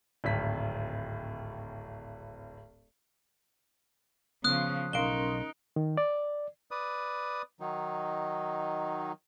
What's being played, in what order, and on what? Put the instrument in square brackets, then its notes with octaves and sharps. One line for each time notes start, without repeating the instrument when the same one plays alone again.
[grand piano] D1 G#1 B6
[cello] C#3 F3 [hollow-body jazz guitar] B3 [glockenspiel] D#6 F#6
[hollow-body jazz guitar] B1 F5 [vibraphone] C#4 A#4 C6 [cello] D#4 [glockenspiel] D7 G7
[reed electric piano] D#3
D5
[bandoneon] B4 D5 D#6
D#3 F#3 D#4